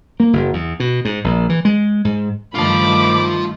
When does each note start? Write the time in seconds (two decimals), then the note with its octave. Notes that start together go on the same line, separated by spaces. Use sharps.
0.20 A#3
0.33 F#1
0.53 E2
0.80 B2
1.05 G#2
1.24 A#1
1.49 E3
1.65 G#3
2.05 G#2
2.55 G2 D#3 A3 F4 A5 B5 D6